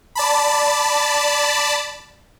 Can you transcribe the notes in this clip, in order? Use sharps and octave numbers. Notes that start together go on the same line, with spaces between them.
D5 A5 B5